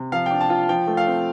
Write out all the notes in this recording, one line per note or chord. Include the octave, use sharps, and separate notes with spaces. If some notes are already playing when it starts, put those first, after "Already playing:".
Already playing: C3
F3 F5
D4 G5
A5
F4
F3 G5
A3
F5
C4